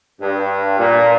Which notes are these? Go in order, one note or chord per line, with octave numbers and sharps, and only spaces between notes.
G2
A#2